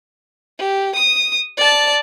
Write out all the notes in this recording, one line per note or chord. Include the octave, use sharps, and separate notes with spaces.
G4
D#6
D5 A5